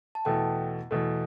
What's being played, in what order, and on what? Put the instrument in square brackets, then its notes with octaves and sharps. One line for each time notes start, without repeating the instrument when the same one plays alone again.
[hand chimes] A5
[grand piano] E2 B2 A3 [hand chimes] G5
[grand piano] E2 B2 A3